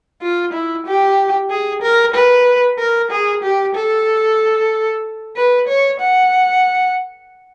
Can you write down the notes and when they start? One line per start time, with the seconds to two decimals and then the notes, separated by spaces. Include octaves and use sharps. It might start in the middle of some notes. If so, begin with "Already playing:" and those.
0.22 F4
0.53 E4
0.87 G4
1.50 G#4
1.82 A#4
2.14 B4
2.79 A#4
3.11 G#4
3.43 G4
3.75 A4
5.36 B4
5.68 C#5
6.00 F#5